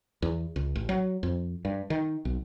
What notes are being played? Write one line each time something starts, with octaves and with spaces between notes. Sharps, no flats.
E2
C#2
A1
F#3
F2
G2
D#3
B1